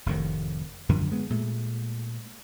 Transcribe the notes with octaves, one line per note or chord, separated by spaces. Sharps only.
F1 A2 C3 D#3
F#2 D3 D#3 F3
G#3 B3
A#2 G#3 A3